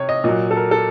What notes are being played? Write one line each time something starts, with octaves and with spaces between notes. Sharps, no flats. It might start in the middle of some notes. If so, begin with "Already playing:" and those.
Already playing: C3 C#5
D#5
A#2 F#3 D#5
A4
A#4
A4